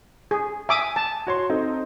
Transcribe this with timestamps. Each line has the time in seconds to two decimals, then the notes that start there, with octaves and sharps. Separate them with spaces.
0.31 G#4
0.69 E5 G#5 D6 D#6
0.96 A5
1.27 F#4 C#5 C6
1.50 C4 D#4 A4